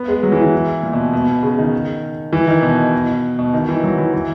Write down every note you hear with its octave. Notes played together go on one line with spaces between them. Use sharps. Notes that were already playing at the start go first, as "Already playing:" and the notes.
Already playing: B3
G#3
F#3
E3
E3
A#2
B2
B2
C#3
D#3
E3
D#3
B2
B2
D#3
E3
F#3
E3
E3